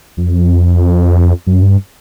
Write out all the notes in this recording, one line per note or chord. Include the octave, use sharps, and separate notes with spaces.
F2
F#2
G2